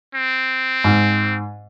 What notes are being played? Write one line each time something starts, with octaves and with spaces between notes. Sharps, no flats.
C4
G#2